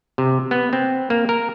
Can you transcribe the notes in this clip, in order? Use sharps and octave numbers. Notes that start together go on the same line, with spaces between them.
C3
B3
C4
A#3
A#4